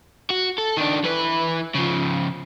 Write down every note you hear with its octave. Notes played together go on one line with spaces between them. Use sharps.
F#4
A4
D#3 D4
E3 B4
C#3 F3